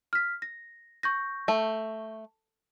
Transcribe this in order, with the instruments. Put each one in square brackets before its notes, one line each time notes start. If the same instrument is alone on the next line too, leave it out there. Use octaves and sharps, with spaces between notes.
[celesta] F6 B6
A#6
C#6 G6 A#6
[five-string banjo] A3